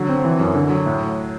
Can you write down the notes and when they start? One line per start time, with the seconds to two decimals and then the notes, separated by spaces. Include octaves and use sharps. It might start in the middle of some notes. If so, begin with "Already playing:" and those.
Already playing: D3 F#3
0.09 C4
0.25 E3
0.40 F#2
0.55 D3
0.70 F#3
0.86 A2